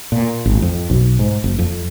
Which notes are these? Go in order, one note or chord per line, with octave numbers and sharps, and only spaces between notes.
A#2
G#1
F2
B1
G#2
F#1
F2